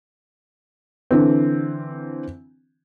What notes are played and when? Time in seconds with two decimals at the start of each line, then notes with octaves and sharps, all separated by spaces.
1.11 D3 E3 C4